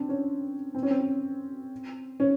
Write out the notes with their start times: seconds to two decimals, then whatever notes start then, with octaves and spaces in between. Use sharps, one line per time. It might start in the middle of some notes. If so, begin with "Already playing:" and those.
Already playing: C4 D4
0.09 C#4
0.74 C4
0.83 C#4
0.91 C4
2.20 C#4